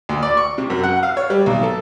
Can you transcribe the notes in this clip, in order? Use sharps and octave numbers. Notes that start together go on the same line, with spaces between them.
D2
D5
C#6
C3
F#2
F#5
F5
C#5
G3
B1
A4